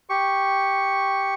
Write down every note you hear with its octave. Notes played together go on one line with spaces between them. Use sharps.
G4 C#6